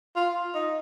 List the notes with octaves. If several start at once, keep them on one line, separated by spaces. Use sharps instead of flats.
F4
D#4